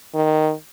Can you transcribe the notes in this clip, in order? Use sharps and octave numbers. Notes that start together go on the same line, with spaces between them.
D#3